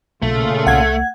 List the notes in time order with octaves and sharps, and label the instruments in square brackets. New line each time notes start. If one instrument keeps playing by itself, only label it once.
[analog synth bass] B1 [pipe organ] A#2 C#3 F4 [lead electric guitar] A3
[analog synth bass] C2 [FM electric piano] F#5 G#6